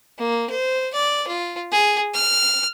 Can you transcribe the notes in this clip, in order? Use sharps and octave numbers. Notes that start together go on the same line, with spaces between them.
A#3
C5
D5
F4
G#4
F6